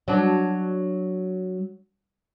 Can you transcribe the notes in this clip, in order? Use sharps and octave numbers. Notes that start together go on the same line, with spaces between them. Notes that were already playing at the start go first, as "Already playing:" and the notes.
F#3 D4